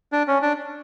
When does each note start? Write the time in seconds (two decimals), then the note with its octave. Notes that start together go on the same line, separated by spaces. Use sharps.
0.12 D4
0.28 C#4
0.42 D4